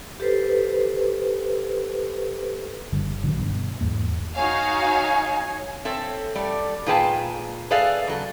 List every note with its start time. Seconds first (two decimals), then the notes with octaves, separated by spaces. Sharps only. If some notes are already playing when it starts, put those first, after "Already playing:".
0.20 G4 A4 B4 C5
2.92 F#1 D3 G3
3.23 A1 D3 D#3 F#3
3.37 G2 B2
3.81 E2 G#2 A#3
4.36 D#4 F#4 C#5 F5 G#5
5.85 C4 A4 C#5 E5
6.35 G3 A3 D5
6.86 A#2 F4 G#4 B4 G5 A5
7.71 G#4 A4 B4 D5 E5 F5
8.07 C#3 F#3 A4